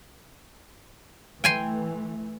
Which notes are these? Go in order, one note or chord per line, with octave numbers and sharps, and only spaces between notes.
E3 A3 G5 G#5 C6